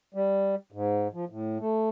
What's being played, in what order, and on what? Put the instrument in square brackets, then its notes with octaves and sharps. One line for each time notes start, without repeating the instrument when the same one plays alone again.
[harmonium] G3
G#2
F3
A2
A3